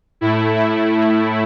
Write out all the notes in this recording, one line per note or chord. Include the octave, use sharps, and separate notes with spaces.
A2 A3 E4
E4
A2 A3